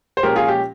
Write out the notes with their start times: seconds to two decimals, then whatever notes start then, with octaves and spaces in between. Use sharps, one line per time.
0.17 C5
0.23 A#2 F3 G#3 C#4 G4 A#4
0.36 F4 G#4
0.49 G4